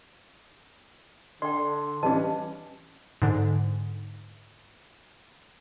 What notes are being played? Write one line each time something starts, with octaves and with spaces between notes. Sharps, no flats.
D3 D5 G5 C6
G2 E3 G3 C#4 D4 D#5 A5
G#2 D3